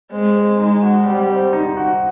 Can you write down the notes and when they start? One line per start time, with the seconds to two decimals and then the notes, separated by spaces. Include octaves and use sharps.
0.12 G#3 C4
0.36 C4
0.59 G#3 D#4
0.83 F#4
1.06 G3 C4
1.30 C4
1.53 D#4
1.77 F#4